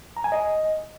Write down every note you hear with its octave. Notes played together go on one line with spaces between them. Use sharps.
A#5
G#5
D#5